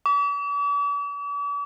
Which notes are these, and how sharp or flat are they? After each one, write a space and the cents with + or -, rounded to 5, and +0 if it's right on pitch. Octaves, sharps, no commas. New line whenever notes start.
D6 -45